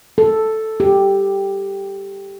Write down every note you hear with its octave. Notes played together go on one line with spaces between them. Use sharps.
A4
G4